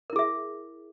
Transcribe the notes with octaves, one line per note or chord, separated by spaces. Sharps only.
E4 G#4 A#4 E5